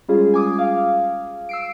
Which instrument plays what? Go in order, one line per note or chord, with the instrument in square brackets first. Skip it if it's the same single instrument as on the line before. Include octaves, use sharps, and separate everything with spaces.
[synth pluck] G3 G#3 C#4 F4 G#4
G#5 D6 D#6
F5
E6 C7 D7